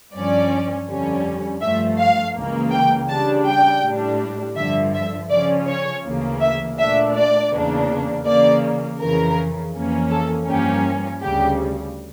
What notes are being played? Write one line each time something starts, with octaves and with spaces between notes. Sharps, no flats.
G2 F3 C#4 D5
F2 D3 G3 C#4
G2 F3 A3 E5
F5
C#2 C#3 E3 A#3
G5
C#3 G3 D4 A5
G5
A2 G3 D4
G2 D3 F3 E5
E5
C#3 F3 C#4 D5
C#5
D2 C#3 E3 A#3
E5
A#2 A3 D4 E5
D5
E2 C#3 E3 A#3 D4
C#3 E3 A#3 D5
F2 C#3 E3 A#4
F2 E3 A#3 C#4
A4
G2 F3 A#3 C#4 G4
D2 C#3 G3 G4